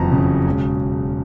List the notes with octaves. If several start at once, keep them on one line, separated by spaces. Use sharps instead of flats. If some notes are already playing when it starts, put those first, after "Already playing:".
Already playing: F#1 F2 E3 A5 A#5
C#3
E1